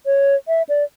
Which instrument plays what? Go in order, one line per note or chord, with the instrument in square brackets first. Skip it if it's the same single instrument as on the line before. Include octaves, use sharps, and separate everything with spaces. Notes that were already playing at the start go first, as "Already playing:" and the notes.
[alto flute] C#5
E5
D5